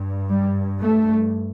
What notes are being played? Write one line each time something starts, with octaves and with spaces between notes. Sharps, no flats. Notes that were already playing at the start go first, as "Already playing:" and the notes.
Already playing: G2
G3
A3